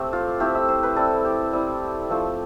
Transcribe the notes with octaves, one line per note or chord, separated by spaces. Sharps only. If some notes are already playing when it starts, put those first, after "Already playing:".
Already playing: A3 C4 G4
F4
A3 C4 E4 G4
E5
C5
B4
G3 C4 E4 A4
G4
G3 C4 E4
F3 A3 C4